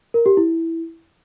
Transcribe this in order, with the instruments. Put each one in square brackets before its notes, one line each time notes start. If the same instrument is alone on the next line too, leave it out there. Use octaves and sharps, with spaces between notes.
[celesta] A#4
G4
E4